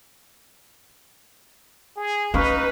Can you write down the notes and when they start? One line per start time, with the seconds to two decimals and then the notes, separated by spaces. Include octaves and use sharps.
1.97 G#4
2.34 C#4 D#4 B4 F5 C#6 F6